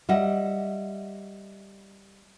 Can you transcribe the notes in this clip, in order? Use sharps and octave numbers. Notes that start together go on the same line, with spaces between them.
G3 D#5 E5 F#5